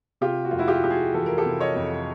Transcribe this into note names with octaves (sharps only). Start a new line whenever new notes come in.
C3 F4 G4
F#4
F2 F4
E4 F#4
F4 G4
F#4
F2 G4
F#4 G#4
E3 A4
A#4
G4 A4
C3
C#5 D#5
F2